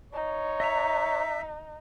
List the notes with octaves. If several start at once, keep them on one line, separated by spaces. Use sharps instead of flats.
D#4 C#5
D#5 E5 A#5